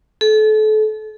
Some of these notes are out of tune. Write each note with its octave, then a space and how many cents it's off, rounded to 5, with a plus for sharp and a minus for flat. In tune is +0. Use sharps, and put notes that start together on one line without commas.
A4 -30